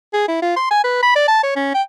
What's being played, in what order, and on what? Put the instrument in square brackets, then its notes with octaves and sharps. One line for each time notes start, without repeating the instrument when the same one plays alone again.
[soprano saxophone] G#4
E4
F4
C6
G#5
B4
B5
D5
A5
C#5
C#4
G5